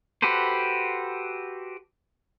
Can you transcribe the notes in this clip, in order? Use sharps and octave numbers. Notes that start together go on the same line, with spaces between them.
F#4 G4 A4 B4 C5